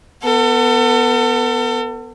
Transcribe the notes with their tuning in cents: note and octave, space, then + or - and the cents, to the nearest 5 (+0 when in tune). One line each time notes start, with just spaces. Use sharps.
B3 +0 A4 +35